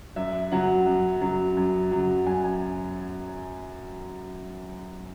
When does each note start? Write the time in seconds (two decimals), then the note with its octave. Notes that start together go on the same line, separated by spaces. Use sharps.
0.16 F#2 E5
0.52 C#3 F#3 F#5
0.86 F#2
1.21 C#3 F#3
1.57 F#2
1.91 C#3 F#3
2.26 F#2 G#5
2.44 G#5